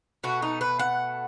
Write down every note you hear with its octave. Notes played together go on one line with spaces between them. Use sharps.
B2 A3 F#4
D#4
B4
F#5